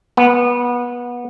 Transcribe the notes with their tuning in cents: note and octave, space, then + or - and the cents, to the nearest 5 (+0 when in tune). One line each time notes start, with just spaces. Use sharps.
B3 -25